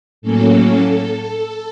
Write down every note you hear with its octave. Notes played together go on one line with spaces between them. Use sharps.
A2 F#3 A#3 C#4 A4